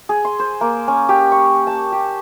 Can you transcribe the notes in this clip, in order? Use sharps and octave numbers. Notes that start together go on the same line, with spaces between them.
G#4
C6
C5
A#3
C#4
G4
C#6
A5
G4